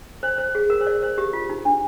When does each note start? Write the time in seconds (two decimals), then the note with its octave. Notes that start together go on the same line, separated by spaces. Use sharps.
0.23 C5
0.38 C5
0.55 G#4
0.70 A#4
0.81 C5
0.87 D5
1.02 C5
1.18 G4
1.33 F4
1.49 D#4
1.65 D4